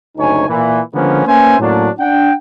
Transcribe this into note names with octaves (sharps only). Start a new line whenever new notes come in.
F#1 D2 D#4 C#5 G#5
A#2 E3
D3 F3 G#3 A#3 B3 C#4
A#3 C#4 B4 C5 E5 G#5
A2 F#3 A#3 C#4 D4
D4 F#5 G5